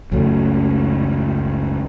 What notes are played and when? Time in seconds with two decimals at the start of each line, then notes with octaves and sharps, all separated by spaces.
0.12 C#2 F#2 F#3 A3